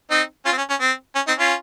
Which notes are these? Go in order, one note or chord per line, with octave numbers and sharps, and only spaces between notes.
C4 D#4
C#4 F4
C4
C#4
C#4
C4
C#4
C4 D#4
C#4 F4